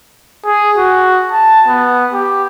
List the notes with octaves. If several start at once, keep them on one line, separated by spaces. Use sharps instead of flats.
G#4
F#4
A5
B3
G4